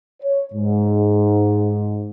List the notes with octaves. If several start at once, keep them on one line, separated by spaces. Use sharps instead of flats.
C#5
G#2